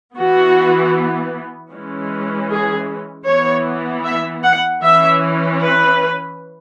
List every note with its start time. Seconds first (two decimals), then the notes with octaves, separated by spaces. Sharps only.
0.17 E3 B3 F#4
1.72 E3 G#3 C#4
2.50 G#4
3.27 E3 B3 C#5
4.05 E5
4.44 F#5
4.82 E3 C#4 E5
5.60 B4